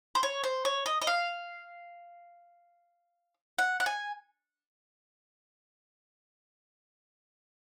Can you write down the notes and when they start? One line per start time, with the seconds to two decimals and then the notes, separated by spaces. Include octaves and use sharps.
0.15 C5
0.23 C#5
0.44 C5
0.65 C#5
0.86 D#5
1.02 D#5
1.07 F5
3.59 F#5
3.80 F#5
3.86 G#5